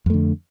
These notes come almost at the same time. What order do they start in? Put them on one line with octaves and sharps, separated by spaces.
F2 A3 D3